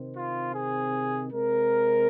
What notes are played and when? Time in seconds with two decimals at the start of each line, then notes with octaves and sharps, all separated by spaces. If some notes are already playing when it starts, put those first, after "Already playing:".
Already playing: C3 D#3 C4
0.16 F4
0.54 G#4
1.31 C3 G#3 C4 A#4